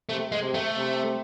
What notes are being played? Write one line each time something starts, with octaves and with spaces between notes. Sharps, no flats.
C3 A3
G#3
C3
A3
C3